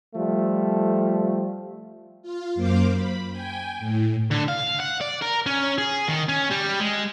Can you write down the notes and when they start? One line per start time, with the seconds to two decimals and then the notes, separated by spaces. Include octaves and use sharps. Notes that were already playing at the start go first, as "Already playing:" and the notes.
0.15 F3 G3 A3
2.22 F4
2.55 F#2 A#3 C5 F5 D6
2.93 B5
3.30 G5 G#5
3.79 A2
4.31 D3
4.48 F5
4.80 F#5
5.01 D5
5.21 A#4
5.46 C#4
5.78 G#4
6.08 D#3
6.29 C#4
6.51 G3
6.81 G#3